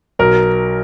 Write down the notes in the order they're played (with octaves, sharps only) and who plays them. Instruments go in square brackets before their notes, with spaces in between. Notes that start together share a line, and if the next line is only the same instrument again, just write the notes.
[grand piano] B1 A#4